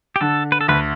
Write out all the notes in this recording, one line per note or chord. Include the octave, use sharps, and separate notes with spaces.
G4
D3 A4
B4
A4
D2 B4